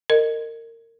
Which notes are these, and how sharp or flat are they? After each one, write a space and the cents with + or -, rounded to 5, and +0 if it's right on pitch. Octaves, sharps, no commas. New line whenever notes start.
A#4 -25 D#5 -15